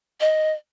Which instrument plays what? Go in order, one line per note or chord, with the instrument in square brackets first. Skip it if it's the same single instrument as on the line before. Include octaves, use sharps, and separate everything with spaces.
[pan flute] D#5